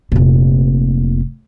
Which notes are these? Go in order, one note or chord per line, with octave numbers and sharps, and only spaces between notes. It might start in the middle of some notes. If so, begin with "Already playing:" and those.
F1 A#2